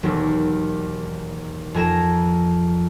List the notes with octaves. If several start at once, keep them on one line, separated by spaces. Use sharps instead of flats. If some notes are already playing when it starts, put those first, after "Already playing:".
E1 D#2 F#3 A#4
F2 G#5 A#5 E7